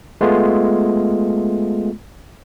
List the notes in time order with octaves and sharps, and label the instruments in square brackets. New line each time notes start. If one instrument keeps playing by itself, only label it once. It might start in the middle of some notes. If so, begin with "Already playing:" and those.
[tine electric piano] G#3 A3 B3 F4